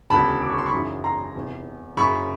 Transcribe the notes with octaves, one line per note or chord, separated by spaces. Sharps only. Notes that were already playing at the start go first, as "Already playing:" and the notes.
E1 D2 C#3 A5 B5
D6
C#6
C6
B5 C#6
G#1 F#2 C#3 E3
A#5 C6
F1 E2 C3
F#1 F#2 C#3 B5 C#6